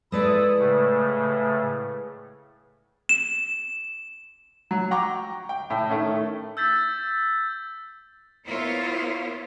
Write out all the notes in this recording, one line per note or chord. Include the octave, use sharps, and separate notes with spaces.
G#3 E4 A4 B4 D5 D#6
A2 C#3 A3
E7
F#3
F#5 G5 A#5 C#6 D6
G5
A2 G5
D#3 A3 C#4
E6 G6 A6 B6
B3 E4 F4 A#4 C5 C#5